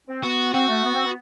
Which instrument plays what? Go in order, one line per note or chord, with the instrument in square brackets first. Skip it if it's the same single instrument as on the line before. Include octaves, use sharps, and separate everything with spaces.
[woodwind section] C4
[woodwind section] B3 [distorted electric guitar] F#4
[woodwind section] C4 [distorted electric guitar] F#4
[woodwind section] A3
B3
C4
B3